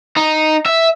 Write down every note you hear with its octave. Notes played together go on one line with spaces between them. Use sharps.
D#4
E5